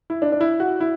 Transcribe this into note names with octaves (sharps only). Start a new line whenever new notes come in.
E4
D4
D4
E4
F#4
E4